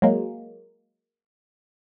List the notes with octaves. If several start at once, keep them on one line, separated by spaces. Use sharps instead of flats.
F#3 G#3 A#3